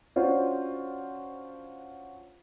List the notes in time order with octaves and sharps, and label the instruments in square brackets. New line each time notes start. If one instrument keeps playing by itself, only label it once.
[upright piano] C#4 D4 F4 F#4 C5